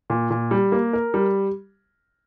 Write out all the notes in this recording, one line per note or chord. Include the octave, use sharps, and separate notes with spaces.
A#2
A#2
G3
A#3
A#4
G3